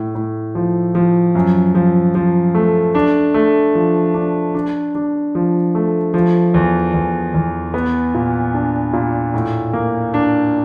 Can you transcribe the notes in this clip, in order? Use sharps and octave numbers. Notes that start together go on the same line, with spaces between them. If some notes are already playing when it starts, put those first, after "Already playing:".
Already playing: A2
A2
F3
F3
F#2
F3
F3
A3
D4
A3
F3
D4
D4
D4
F3
A3
F3
E2
E2
E2
B3
A#2
D4
A#2
A2
A#3
D4